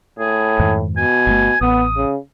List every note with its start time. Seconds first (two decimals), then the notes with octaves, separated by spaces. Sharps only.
0.19 A2 G#4
0.59 F2 G#2 D#3
0.97 B2 G#5
1.27 G1 A#2 A3
1.61 A1 B3 D#6
1.97 C#3